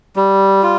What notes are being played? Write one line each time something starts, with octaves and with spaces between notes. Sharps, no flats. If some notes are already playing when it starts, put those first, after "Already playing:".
G3
F4